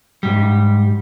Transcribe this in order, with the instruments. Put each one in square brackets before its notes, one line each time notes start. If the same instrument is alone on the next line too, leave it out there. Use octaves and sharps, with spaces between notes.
[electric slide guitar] G#2 G3